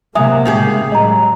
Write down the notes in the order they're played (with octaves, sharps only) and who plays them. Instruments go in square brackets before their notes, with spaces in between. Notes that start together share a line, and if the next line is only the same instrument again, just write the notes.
[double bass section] C3 G#3 A#3 [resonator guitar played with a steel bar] F#3 [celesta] E5 G#5 D#6
[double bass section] A2 G#3 [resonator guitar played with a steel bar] C#3 G4 G#4
[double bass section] F#3 [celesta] D#5 A#5